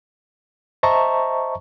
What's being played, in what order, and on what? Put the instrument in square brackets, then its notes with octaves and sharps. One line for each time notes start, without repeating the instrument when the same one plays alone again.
[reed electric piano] C5 D#5 E5 A5 A#5 C#6